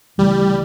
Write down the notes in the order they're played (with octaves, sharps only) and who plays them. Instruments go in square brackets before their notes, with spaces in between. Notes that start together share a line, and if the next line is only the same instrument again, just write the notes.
[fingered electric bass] D2 C#3 E3 A3 [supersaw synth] G3